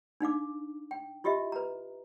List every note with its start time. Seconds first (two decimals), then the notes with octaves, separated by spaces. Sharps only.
0.21 D4 D#4 F5 D6
0.91 G5
1.24 E4 F4 G4 D#5 E5
1.52 B4 A#5